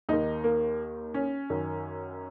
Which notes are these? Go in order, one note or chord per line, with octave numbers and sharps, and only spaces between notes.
D#2 D#3 D#4
A#3
C#4
F#2 D#3